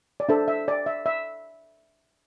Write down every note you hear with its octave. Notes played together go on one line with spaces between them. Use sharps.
D5
D4 A4 C5 E5
E5
D5
E5
E5